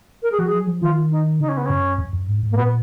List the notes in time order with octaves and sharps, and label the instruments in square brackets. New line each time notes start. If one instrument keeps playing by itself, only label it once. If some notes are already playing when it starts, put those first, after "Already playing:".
[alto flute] A#4
G#4
[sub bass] F3 [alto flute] F#4
[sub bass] F#3 [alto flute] G#4
[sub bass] F3
[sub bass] D#3 [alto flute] F4
[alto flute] D#4
[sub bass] C#3 [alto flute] D#4
[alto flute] C#4
B3
[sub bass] F#2 [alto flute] C#4
[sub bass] F2
F#2
G#2
G#2
[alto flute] A#3
[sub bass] A#2 [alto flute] B3